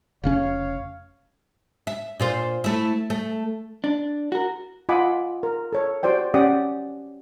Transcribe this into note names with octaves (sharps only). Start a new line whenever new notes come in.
F1 C#3 C#4 C#5 F5
E5
A#2 F4 C5
A3 E4
A3
D4
F#4 A#4
F4 D#5 F#5 G#5 B5 D6
A#4
A4 C#5
F#4 G4 C5 D5 G5
C#4 G4 D5 F#5 D#6